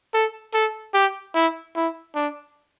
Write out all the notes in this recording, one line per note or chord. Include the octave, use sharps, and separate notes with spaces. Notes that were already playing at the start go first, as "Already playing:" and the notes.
A4
A4
G4
E4
E4
D4